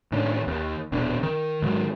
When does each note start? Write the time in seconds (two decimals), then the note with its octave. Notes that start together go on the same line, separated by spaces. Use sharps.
0.12 A2 D#3 C#4 D4
0.47 D#2
0.92 D#1 B2 D4
1.23 D#3
1.62 G#2 D#3 F#3